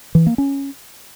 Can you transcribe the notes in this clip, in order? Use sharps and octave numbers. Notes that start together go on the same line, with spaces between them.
E3
A#3
C#4